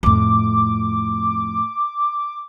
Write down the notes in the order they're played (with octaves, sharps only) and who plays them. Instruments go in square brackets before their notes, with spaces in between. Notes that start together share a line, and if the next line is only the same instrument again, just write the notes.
[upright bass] F2 A2 [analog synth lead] D6